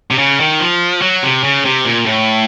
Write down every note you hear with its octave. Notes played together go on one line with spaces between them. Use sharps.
C3
C#3
D#3
F3
F#3
C3
C#3
C3
A#2
A2